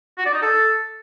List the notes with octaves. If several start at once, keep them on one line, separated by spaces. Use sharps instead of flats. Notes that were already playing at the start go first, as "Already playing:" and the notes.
F#4
D5
D#4
A4